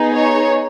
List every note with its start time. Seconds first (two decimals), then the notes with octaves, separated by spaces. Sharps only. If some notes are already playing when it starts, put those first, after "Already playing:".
Already playing: B3 D#4 G#4
0.14 C#5